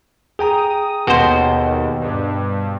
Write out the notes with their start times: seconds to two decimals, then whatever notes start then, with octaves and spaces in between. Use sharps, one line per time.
0.39 G#4 G5 A#5 D#6
1.07 D#2 B2 C5
2.00 G2